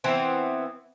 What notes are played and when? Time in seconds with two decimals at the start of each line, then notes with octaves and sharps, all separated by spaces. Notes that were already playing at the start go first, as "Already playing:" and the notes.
0.04 E3 B3 C4